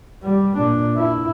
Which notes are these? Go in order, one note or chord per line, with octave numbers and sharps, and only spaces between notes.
G3
A#2 D4
E4